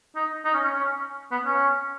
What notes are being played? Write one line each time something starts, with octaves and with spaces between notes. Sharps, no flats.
D#4
D#4
C#4
C#4
C#4
B3
C#4